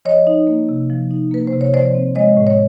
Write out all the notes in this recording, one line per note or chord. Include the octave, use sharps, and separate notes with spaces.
F3 C#5 D#5
D#4
A#3
C3
F3
D#4
A#3 B4
C5
C3
C#5
F3 C5 D5
C4
G#3 C#5 D#5
A2
C#5